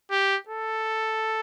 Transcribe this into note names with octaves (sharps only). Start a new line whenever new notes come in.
G4
A4